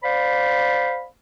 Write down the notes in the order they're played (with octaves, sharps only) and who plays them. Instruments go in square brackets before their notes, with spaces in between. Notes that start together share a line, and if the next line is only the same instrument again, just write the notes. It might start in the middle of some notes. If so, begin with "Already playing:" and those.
[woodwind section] C5 D5 F5 B5